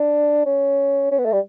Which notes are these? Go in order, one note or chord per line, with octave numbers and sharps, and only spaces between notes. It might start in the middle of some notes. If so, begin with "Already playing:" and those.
Already playing: D4
C#4
C#4
B3
A3
G3